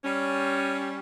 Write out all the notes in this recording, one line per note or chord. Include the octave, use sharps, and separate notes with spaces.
G3 C#4